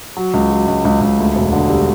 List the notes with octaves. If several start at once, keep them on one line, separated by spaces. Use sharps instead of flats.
F#3
C#2
F#3
C#2
C#2
C#2
D2
E1
D3
G3